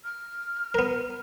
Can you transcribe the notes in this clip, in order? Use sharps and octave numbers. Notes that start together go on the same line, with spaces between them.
F6
B3 A#4